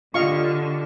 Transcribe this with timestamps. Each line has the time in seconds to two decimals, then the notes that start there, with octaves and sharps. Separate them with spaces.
0.14 D3 F4 G4 D#5 F5 C#6